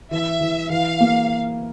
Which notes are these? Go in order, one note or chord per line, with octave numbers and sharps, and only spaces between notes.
E3 E5
E3
E3 F5
A#3